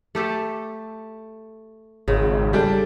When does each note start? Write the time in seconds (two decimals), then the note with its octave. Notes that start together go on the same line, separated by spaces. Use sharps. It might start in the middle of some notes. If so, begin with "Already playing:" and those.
0.15 A3 G4 A4
2.08 G#1 C#3
2.53 G3 D4 G4 A4